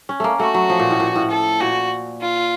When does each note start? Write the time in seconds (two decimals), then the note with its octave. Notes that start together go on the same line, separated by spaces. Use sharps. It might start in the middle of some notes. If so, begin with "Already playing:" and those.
0.09 C#4
0.20 A3 A#3
0.40 A3 F#4
0.54 F#3
0.70 F3
0.80 A#2
0.90 A2
1.00 A#2
1.16 A2
1.31 A4
1.61 A#2 F#4
2.21 F4